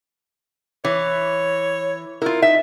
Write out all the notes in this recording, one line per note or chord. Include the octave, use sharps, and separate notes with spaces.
E3 C#5
E4 F4 A#4
D#4 E5